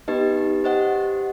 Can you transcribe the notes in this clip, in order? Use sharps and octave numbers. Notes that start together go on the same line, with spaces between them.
B3 D#4 G4 B4 D#5
G4 C5 D#5 F#5